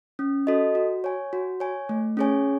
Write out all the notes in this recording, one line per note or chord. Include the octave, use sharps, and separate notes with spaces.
C#4
F#4 A4 D#5
F#4
C#5 G#5
F#4
C#5 G#5
A3
C#4 G#4 C#5 G#5